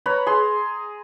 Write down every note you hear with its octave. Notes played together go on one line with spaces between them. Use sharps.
B4 C#5 A#5 B5
G#4 C6